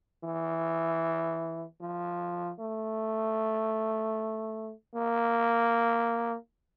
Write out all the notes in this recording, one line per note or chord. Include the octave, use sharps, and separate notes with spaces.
E3
F3
A3
A#3